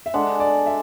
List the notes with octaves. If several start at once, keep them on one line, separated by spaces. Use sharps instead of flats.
E5
G#3 D4 A4 F#5
D5
E5